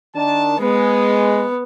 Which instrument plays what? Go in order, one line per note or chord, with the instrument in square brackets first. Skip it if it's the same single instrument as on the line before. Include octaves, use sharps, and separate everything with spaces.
[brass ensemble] D#3 D4 A5
[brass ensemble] G#3 [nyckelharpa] B3